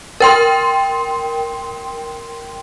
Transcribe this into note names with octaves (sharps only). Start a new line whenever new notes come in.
A#4 G5 C6